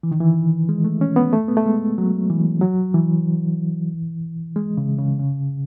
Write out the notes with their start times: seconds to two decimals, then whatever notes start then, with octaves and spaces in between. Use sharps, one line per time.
0.03 E3
0.12 D#3
0.20 E3
0.69 G#3
0.84 A3
1.01 C#4
1.16 B3
1.33 A3
1.48 B3
1.57 A3
1.66 G#3
1.98 F#3
2.30 E3
2.61 F#3
2.94 E3
4.56 G#3
4.77 C#3
4.98 C#3
5.19 C#3